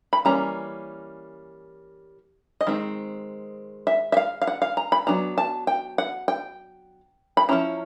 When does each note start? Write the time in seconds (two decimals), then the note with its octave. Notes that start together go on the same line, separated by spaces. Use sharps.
0.13 B5
0.25 E3 G3 A#3 C#4 A#5
2.61 D#5
2.67 D#3 G#3 C4
3.87 E5
4.12 E5
4.17 F5
4.42 F5
4.47 F#5
4.62 F5
4.77 A#5
4.92 B5
5.07 F#3 B3 D4 A#5
5.38 A5
5.67 G5
5.98 F#5
6.28 G5
7.37 B5
7.49 F3 G#3 C#4 E4 A#5